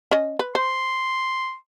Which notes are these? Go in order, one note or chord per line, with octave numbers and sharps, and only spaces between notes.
C#4 D#5
B4
C5 C6